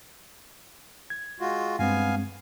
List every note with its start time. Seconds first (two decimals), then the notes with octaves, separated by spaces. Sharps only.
1.10 G#6
1.40 G#3 F4 F#4
1.79 G2 G#3 B3 C4 F5 G#5